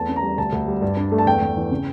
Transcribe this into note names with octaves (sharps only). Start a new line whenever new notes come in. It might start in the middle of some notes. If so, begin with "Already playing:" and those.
Already playing: E2 A3 A5
C#4
A#5
G3
D2 A5
D2
G3
G2
D4
A3
A5
E2 G5
E2
E3
C#3